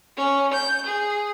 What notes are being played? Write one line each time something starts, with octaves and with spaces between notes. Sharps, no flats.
C#4
G6
G#4